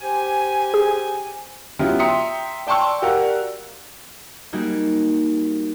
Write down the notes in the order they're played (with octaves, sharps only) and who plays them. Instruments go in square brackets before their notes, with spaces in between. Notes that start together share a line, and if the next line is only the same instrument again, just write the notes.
[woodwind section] G4 C5 G#5
[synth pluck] G#4
[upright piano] F#3 B3 C#4 E4 F4 G4
E5 G5 A#5 C6 D#6 C#7
D5 G5 A5 C6 C#6 E6
F#4 G4 A#4 D5 F5 F#5
[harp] G3 A#3 D#4 F#4 G#4